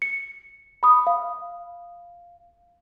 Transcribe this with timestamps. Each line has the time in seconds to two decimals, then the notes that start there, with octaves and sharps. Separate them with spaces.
0.02 C#7
0.83 B5 D#6
1.07 F5